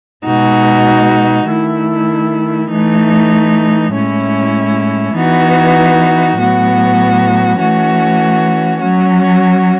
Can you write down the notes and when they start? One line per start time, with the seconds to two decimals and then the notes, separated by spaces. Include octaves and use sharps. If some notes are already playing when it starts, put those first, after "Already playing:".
0.24 B2 G#3 D#4 F#4
1.46 D#3 A3 E4
2.69 E3 A3 D#4
3.92 A2 G#3 C#4 E4
5.14 E3 B3 D#4 F#4
6.36 A2 F#3 B3 F#4
7.59 E3 A3 C#4 F#4
8.81 F#3 C#4 F#4